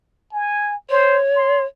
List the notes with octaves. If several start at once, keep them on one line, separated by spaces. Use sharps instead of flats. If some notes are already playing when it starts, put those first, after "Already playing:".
G#5
C5 C#5
C6